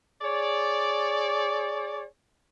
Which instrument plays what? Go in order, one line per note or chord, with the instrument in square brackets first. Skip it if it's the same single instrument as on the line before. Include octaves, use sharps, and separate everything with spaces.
[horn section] G#4 C#5 D5